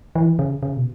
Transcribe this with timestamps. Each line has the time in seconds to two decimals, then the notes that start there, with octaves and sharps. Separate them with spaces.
0.15 E3
0.39 C#3
0.63 C#3
0.77 B2